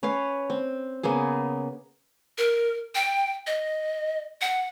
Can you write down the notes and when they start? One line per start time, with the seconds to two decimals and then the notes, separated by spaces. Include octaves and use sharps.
0.03 C#4 B4 C#5 F5
0.50 C4
1.03 C#3 A#3 B3 G#4
2.38 A#4
2.95 G5
3.47 D#5
4.41 F#5